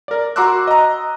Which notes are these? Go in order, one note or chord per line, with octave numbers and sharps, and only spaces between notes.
A#4 D5
F#4 A#5 C6 D6 E6 F#6
D#5 A#5